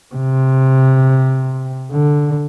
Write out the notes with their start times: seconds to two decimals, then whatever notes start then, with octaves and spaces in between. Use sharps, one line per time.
0.15 C3
1.91 D3